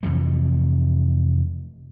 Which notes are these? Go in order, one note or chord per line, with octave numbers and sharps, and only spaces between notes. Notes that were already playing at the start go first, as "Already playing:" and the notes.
F2 C3 E3 A3